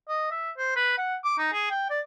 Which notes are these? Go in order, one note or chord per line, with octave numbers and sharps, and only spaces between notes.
D#5
E5
C5
B4
F#5
D6
D#4
G#4
G5
D5